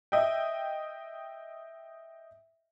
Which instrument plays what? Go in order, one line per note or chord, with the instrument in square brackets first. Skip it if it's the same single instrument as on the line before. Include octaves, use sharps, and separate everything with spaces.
[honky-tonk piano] D#5 E5 G5